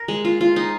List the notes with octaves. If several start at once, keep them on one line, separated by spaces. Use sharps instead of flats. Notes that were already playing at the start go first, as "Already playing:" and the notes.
Already playing: A#4
G#3
F4
F4
D#4